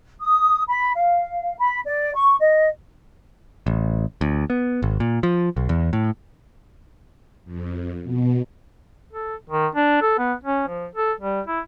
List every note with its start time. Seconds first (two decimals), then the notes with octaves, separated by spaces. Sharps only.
0.20 D#6
0.67 B5
0.95 F5
1.58 B5
1.86 D5
2.15 C#6
2.40 D#5
3.66 A1
4.21 D2
4.50 B3
4.82 G#1
5.00 A#2
5.23 F3
5.57 B1
5.69 E2
5.93 A2
7.45 F2
8.04 B2
9.13 A4
9.50 D#3
9.75 D4
10.02 A4
10.18 B3
10.43 C#4
10.68 F3
10.95 A4
11.20 G3
11.47 E4